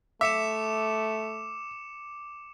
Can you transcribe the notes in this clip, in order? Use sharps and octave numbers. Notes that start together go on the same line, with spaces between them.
A3 E5 D6 C#7 E7